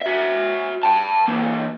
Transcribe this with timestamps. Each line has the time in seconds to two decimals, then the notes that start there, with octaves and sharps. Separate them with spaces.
0.01 F#4 E5
0.83 G5 A5
1.28 E3 A#3